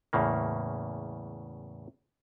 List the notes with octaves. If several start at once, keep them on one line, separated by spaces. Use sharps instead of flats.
E2 A2 C#3 A#3